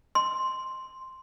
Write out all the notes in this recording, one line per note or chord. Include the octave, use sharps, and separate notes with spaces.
C6